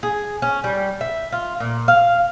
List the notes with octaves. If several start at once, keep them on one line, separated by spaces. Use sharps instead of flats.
G#4
C#4
G3
E5
F4
A#2
F5